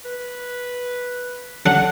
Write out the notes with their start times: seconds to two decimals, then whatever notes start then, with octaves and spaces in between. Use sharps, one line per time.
0.05 B4
1.66 D3 F#3 D4 F#5